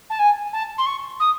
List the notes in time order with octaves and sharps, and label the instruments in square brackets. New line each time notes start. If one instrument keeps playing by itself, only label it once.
[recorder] A5
G#5
A5
C6
C#6
D#6